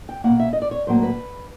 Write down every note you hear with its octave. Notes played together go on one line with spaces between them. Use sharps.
G5
B2 F#3 A#3 F#5
E5
D#5
D5
C#5
A2 F#3 A#3 C5
B4